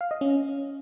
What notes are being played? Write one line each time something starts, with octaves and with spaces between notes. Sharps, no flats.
F5
D#5
C#4